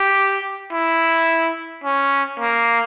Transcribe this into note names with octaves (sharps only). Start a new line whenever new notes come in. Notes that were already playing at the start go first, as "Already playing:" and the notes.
Already playing: G4
E4
C#4
A#3